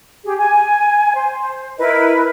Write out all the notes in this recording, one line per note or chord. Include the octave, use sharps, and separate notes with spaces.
G4 G#4
G#5
C5
E4 A#4 B4 D#5